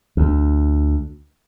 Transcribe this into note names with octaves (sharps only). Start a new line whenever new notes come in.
D2